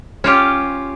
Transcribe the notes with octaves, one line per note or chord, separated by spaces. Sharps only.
C#4 F4 G4